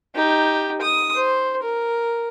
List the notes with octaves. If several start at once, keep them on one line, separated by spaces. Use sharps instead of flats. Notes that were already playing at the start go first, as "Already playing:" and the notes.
D#4 G4
D#6
C5
A#4